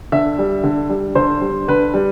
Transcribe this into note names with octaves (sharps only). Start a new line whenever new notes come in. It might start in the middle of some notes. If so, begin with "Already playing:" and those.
D3 E5
G3
D3
G3
D3 C5
G3
D3 B4
G3